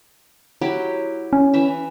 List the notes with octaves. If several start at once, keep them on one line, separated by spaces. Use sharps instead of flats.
F#3 E4 G4
C#4
E3 E5